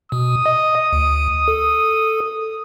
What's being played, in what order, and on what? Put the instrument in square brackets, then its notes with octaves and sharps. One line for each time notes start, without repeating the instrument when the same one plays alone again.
[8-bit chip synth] B2 [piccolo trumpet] D#6
[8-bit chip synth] D#5
D2
A4